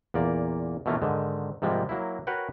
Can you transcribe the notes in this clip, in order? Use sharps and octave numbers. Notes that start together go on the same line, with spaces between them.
E2 A#2 A#3 D5
B2 E3 A3 A#3 C#4 F4
G#2 D3 D#3
G#2 C3 F3 G3 G#3 A#3
F#3 A#3 E4
F#4 A#4 B4 C#5 F#5 G5